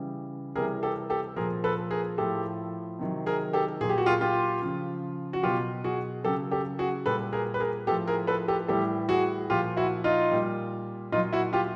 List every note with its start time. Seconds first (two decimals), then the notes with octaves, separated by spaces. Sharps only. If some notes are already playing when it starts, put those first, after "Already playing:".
Already playing: C#3 E3 G3
0.55 C3 E3 G3 G#4 A#4
0.83 G4 A4
1.10 G4 A4
1.36 A#2 F3 G#4 A#4
1.64 A4 B4
1.91 G#4 A#4
2.18 A2 F3 G4 A4
2.99 C3 D#3 F#3
3.26 G#4 A#4
3.53 G4 A4
3.81 A#2 F#3 G#4
3.89 G4
3.98 F#4
4.06 F4 G4
4.21 F4 G4
4.62 C#3 F3
5.33 F#4
5.43 B2 F#3 F4 G4
5.84 F#4 G#4
6.24 C#3 F#3 G4 A4
6.51 G4 A4
6.79 F#4 G#4
7.06 A#2 G3 A4 B4
7.33 G#4 A#4
7.54 B4
7.60 G#4 A#4
7.87 A2 F3 G4 A4
8.08 G#4 A#4
8.27 A4 B4
8.48 G4 A4
8.68 A2 E3 G3 G4 A4
9.09 F#4 G#4
9.50 A#2 F3 F4 G4
9.77 E4 F#4
10.04 D#4 F4
10.31 A#2 G3
11.12 A#2 D#4 F4
11.16 F#3
11.33 E4 F#4
11.53 F4 G4